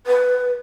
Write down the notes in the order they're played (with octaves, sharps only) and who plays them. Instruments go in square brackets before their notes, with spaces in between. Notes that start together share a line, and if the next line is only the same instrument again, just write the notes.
[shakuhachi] B4